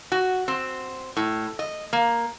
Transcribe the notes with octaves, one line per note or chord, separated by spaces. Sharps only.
F#4
C4
A2
D#5
A#3